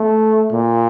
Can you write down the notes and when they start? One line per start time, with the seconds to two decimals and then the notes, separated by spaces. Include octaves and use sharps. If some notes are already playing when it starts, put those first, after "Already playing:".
Already playing: A3
0.52 A#2